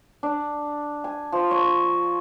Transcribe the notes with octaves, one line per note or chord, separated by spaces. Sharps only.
D4
G#5
F3
C#5